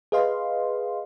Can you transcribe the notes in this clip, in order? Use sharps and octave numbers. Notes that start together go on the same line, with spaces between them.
G#4 B4 D#5 F5 C6